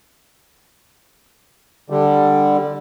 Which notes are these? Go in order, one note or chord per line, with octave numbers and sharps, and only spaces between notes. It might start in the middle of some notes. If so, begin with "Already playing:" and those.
D3 G3